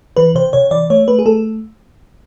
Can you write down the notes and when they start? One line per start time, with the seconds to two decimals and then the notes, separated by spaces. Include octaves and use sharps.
0.17 E3 B4
0.35 C3 C5
0.53 C3 C#5
0.71 E3 D5
0.90 A3 C#5
1.08 A3 B4
1.19 G#4
1.26 A3 A4